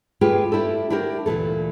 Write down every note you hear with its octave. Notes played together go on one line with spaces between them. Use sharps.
A3 F4 G4 G#4 B4
D4 E4 G4 A4
D4 E4 F#4 G4 A#4
D2 A#2 E3 A4